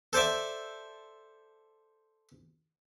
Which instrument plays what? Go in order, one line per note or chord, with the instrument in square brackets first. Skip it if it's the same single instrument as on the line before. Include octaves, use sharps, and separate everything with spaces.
[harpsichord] A4 C5 D5 E5